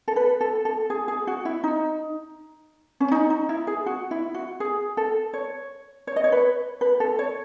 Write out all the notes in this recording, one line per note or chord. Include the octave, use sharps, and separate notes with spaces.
A4
B4
A4
A4
G#4
G#4
F#4
E4
D#4
C#4
D#4
D#4
E4
G#4
F#4
E4
F#4
G#4
A4
C#5
C#5
D#5
C#5
B4
B4
A4
C#5